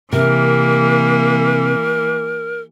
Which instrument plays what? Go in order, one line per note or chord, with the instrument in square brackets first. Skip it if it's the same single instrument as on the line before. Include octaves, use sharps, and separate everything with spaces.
[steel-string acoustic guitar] C3 [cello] E3 A#3 [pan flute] A#4